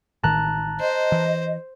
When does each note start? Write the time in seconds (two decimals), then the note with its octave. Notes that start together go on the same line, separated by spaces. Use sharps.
0.24 A1 D#3 A5 A#5 F#6
0.80 C5 D#5
1.12 E3